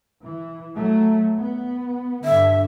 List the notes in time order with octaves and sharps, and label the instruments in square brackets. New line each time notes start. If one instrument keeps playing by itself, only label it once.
[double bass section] E3
F#3 A3
B3
[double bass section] G2 D3 [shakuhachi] E5